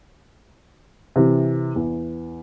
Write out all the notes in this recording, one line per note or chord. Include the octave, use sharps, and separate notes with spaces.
C3 E3
E2